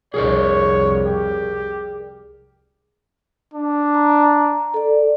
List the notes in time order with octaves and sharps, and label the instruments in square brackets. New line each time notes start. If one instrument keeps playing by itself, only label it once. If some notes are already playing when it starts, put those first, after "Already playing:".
[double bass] C2 F2 [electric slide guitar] G#4 A#4 D5 [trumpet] C#5
[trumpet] G4
[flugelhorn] D4
[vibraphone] A#5
A4 D5